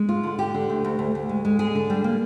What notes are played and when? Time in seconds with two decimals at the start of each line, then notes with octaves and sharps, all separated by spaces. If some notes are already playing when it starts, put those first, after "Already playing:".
Already playing: G#3
0.09 F4
0.23 D3
0.38 D3 G4
0.54 D3
0.70 D2
0.85 D2
0.99 D2
1.15 D2
1.29 G#3
1.45 G#3
1.59 D3 G#4
1.75 D3
1.90 G3
2.04 A#3